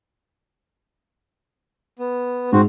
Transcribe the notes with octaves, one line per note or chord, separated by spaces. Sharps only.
B3
G#2 C4 F#4